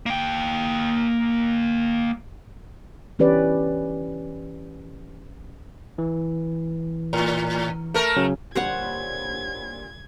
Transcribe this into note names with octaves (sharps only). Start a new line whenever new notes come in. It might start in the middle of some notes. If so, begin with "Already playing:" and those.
A#3 G5
E3 C#4 G4 B4 D5
E3
A2
A3 A#4
C#3 F#3 C#4
A#2 D3 G3 C5 C#5 F#5 G#6